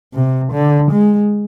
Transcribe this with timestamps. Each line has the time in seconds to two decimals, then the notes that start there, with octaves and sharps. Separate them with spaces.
0.14 C3
0.52 D3
0.91 G#3